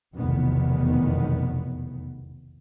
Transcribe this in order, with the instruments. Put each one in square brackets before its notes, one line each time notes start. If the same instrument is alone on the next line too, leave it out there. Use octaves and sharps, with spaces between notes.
[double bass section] F1 B1 E2 D#3 B3